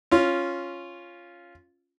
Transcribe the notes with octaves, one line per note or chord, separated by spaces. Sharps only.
C#4 F4